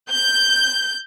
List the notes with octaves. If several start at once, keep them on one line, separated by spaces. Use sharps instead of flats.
G6